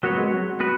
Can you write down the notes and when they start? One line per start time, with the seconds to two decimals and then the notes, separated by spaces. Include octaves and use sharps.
0.03 F#3 A#3 B3 F#4 C#5
0.17 G#3
0.31 F#3
0.60 B3 F#4 B4